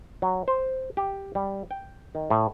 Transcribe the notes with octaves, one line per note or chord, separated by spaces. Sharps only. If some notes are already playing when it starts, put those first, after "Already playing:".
F#3
C5
G4
G3
G5
D#3
A2